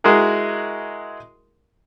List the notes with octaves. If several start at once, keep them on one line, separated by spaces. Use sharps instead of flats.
G#3 E4 F#4 G#4 A#4